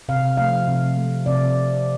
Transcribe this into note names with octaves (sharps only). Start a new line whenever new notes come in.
C3 F5
F3 A3 F5
C3
A3
C3 D5